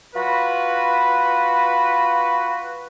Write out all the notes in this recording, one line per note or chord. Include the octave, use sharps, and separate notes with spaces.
F4 F#4 B4